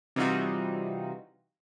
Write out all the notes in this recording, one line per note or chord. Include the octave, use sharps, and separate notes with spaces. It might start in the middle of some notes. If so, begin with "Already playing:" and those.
C3 E3 G3 D#4 F4 F#4